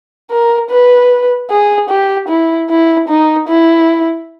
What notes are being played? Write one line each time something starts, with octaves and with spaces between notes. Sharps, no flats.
A#4
B4
G#4
G4
E4
E4
D#4
E4